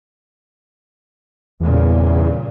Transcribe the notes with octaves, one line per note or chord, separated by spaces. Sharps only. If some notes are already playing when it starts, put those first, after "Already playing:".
E2 G2 A#2 C#3